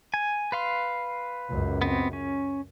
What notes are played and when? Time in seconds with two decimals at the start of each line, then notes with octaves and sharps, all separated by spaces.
0.14 G#5
0.52 B4 F5 C6
1.50 C#2 F#2
1.82 B3 C4
2.13 C#4